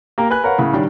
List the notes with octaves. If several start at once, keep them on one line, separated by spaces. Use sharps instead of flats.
A#3 G4 A#4
B4 G#5 F#6
A#4 B4 C#5 F5 F#5
A2 C#3
D#3 G3 D4